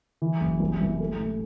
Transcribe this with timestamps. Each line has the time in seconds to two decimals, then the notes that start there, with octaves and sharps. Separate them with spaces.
0.22 E3
0.41 F#1
0.60 C2
0.81 C2
1.00 A3
1.19 A2